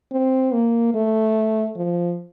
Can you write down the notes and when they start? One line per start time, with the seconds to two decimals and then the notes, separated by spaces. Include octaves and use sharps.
0.11 C4
0.52 A#3
0.94 A3
1.76 F3